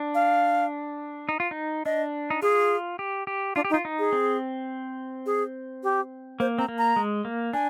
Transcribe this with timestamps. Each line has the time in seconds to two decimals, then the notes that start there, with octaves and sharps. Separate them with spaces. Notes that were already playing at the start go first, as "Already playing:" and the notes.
Already playing: D4
0.15 F5
1.29 D#4
1.40 F4
1.51 D#4
1.85 D4 D#5
2.30 D#4
2.42 F4 G#4
2.99 G4
3.27 G4
3.55 D4 F4
3.65 G4
3.70 D#4
3.74 F4
3.85 D#4
3.99 G#4
4.13 C4
5.26 G#4
5.83 G4
6.40 A#3 C5
6.58 C4 A#5
6.68 A#3
6.78 A#5
6.96 G#3
7.25 A#3
7.53 D4 G#5